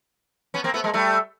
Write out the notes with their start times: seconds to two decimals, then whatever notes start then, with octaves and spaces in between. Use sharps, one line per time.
0.54 B3 C#4
0.64 A#3 C4
0.74 A3 B3
0.84 G#3 A#3
0.94 G3 A3